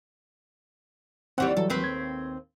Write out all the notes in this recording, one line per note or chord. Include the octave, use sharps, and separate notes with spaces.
D#2 E3 G3 C4 F#5
E3 F#3 G3 A4
D#2 C4 B4
G#6